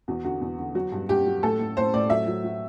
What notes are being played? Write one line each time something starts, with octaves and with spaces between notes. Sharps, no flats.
E2 F#4
D3 F#4
E2
D3
F#3 F#4
G2
G2 G4
F#3
A2 A4
A2
A2 C5
A2 D5
F#3 E5
F#3
F#3